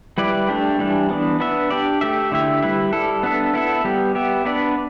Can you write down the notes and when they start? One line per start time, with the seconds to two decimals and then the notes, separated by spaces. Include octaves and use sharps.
0.18 G3 E4 B4 D5
0.48 A3 D4 G4
0.79 E3 G3 D4
1.10 E3 B3 D4
1.40 B3 D4 B4 E5
1.70 D4 G4 D5
2.01 A3 G4 E5
2.32 D3 A3 E4 G4 E5
2.62 G3 E4 B4 E5
2.93 G3 E4 A4
3.23 B3 D4 A4 E5
3.54 B3 E4 A4 E5
3.84 G3 B3 G4
4.15 B3 G4 E5
4.45 B3 D4 B4 D5